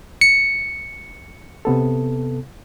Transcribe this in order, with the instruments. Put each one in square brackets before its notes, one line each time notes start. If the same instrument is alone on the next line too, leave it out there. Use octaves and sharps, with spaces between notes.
[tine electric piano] C#7
[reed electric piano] C3 B3 A4